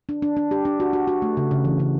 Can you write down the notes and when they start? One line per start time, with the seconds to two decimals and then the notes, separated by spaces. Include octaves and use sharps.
0.09 D4
0.22 D4
0.37 D4
0.51 G4
0.65 D4
0.80 F#4
0.93 F#4
1.08 F#4
1.22 A3
1.37 C#3
1.51 C#3
1.65 E3
1.80 C#3